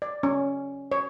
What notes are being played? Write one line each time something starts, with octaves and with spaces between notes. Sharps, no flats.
D5
C#4
C#5